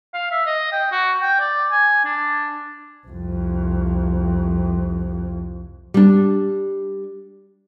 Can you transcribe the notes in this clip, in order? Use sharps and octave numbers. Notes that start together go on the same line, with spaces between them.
F5
E5
D#5
G5
F#4
G5
D5
G#5
D4
C2 F2
G3 D4